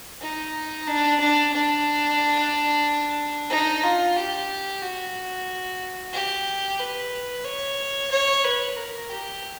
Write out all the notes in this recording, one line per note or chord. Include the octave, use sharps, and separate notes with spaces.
D#4
D4
D4
D4
D#4
F4
G4
F#4
G4
B4
C#5
C#5
B4
A#4
G4